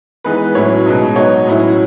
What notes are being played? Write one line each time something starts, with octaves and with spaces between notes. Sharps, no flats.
E3 G#3 B3 D#4 B4
A2 F#3 C#4 E4 C#5
B2 G#3 B3 D#4
F#3 B3 D#4 C#5
A2 F#3 C#4 E4